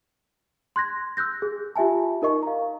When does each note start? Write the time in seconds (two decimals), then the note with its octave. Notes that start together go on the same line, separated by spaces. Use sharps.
0.76 C6 F#6 G#6 A#6
1.17 E6 F#6 G6 A#6
1.42 G#4
1.76 F4 G4 E5 G#5 A5
2.22 D#4 A#4 D#5 C#6
2.43 F5 A#5